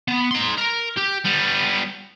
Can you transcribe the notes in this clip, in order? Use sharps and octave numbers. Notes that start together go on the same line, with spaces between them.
B3
D#4 C6
A#4
G4
G3 B3